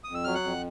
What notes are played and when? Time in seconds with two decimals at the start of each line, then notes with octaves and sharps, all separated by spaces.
0.04 F2 D#6
0.15 E6
0.24 F#3 F6
0.35 F#5 F#6
0.44 F2